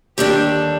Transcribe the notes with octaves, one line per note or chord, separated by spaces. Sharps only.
D#2 D3 G3 D4 G4